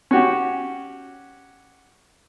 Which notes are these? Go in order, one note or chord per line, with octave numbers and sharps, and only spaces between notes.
C#4 F#4 G4